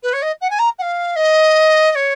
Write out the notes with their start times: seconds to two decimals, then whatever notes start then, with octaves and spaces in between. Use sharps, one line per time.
0.03 B4
0.13 C#5
0.22 D#5
0.41 F#5
0.50 G#5
0.59 A#5
0.79 F#5
0.82 F5
1.16 D#5
1.91 D#5
1.95 C#5